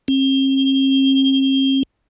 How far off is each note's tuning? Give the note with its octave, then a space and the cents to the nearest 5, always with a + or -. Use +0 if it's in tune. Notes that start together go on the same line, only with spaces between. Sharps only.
C4 +45